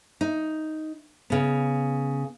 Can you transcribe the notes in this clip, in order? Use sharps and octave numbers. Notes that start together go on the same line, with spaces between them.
D#4
C#3 B3